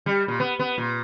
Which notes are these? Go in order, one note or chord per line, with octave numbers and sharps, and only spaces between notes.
G3
A#2
B3
B3
A#2